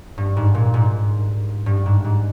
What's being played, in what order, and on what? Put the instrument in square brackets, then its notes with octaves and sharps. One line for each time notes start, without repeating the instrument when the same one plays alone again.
[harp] G2
G#2
A#2
G#2
G2
G#2
G#2